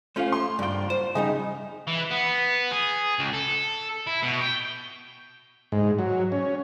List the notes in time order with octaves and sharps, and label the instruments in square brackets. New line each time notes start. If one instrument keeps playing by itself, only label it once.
[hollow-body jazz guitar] A3 C#4 F4 [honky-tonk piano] C5 F5
[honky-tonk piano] C6
[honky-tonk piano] F#1 F4 [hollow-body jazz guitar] G2 G5
[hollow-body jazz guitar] C5
[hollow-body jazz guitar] C#3 G3 D#4 [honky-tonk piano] D#5
[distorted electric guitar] E3
B3
G#4
C#2
A4
E4
B2
G5
[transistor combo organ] G#2
F#3
C#4